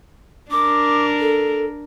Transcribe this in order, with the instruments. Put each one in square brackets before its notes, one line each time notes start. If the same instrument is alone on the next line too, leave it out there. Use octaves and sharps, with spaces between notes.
[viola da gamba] D4 A#4 [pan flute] D6
[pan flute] A4